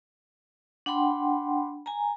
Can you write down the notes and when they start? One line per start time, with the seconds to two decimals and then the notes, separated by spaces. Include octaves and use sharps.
0.86 D4 F#5 G5 B5 C6
1.86 G#5 A#5